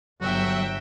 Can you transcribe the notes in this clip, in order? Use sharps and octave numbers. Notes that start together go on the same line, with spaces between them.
G1 F#3 F#4 E5 G5